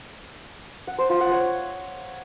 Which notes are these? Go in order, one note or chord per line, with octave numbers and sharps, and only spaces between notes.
F#5
C5
F4
F#5
C#5